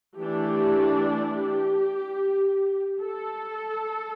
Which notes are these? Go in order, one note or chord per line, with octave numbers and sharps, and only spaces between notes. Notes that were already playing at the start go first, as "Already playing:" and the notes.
E3 A3 D4 G4
G4
A4